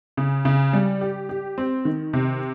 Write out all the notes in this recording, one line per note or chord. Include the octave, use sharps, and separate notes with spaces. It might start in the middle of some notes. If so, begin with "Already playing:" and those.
C#3
C#3
G3
G4
G4
C4
D#3
C3